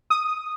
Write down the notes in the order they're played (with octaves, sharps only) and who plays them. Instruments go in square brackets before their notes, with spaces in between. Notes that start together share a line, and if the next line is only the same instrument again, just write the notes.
[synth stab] D#6